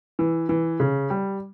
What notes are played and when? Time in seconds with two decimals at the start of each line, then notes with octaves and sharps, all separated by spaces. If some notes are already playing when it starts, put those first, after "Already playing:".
0.19 E3
0.49 E3
0.80 C#3
1.10 G3